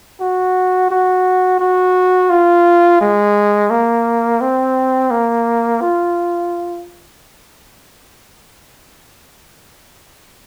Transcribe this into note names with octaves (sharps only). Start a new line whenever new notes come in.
F#4
F#4
F#4
F4
G#3
A#3
C4
A#3
F4